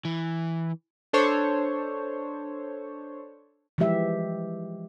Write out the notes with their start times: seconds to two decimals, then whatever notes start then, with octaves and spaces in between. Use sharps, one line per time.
0.05 E3
1.13 D4 A4 C5 C#5
3.78 E3 F3 G#3 G4 E5